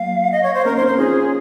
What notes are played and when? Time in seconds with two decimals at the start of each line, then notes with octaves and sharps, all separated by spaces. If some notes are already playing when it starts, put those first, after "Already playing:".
Already playing: F#3 A#3 F5
0.32 D#5
0.43 C#5
0.54 C5
0.65 A#3 C#4 A#4
0.76 C5
0.81 C4 D#4
0.87 C5
0.98 C#4 F4 G#4